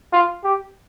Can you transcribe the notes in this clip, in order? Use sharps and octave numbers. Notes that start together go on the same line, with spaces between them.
F4
G4